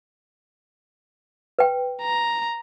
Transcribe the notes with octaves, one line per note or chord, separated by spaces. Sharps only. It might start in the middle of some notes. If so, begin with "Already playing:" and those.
B4 G5
A#5